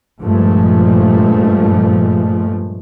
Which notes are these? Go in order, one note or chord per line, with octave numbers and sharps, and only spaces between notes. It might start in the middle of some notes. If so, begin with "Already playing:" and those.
G2 A#2 F3 G#3 A3